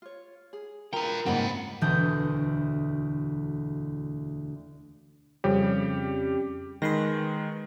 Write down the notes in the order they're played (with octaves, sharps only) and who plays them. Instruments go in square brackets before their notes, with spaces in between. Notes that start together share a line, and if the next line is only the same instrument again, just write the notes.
[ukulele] F4 C#5
G#4
[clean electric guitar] F4 A#4 [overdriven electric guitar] B4 G5
[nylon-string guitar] G#2 C#3 A#3 [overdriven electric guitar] C4 B5 [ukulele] F#5 G5
[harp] E1 D2 E3 A3 D#6 G6
[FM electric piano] F2 C#3 [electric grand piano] G3 G4
[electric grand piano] D#3 G#3 [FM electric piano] B4 C6 A#6